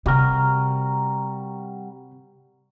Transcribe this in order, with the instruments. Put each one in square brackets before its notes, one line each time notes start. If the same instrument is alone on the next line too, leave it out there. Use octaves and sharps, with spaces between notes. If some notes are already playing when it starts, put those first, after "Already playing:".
[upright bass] C3 [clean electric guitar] G3 F#4 A#4